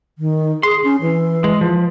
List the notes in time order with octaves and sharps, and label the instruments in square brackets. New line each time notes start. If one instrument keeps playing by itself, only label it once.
[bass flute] D#3
[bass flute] G#4 [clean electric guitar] C6
[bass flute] C#4
E3
[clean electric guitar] G#3
F3